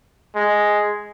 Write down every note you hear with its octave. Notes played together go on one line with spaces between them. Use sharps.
G#3